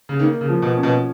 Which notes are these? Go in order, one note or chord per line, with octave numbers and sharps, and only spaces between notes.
C#3
D#3 A#3
C#3
F3
B2
C#4
B2